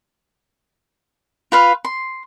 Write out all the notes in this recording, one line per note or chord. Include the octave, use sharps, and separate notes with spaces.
F4 B4 F5
C6